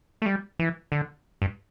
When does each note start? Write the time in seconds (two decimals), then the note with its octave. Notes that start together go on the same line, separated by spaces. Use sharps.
0.22 A3
0.26 G3
0.59 E3
0.92 D3
1.42 G2